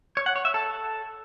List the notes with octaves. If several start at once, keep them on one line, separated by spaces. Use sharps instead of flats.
C#5
F#5
C#5
E5
A4